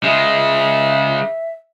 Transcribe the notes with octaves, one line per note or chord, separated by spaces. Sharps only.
C#3 G#3 E5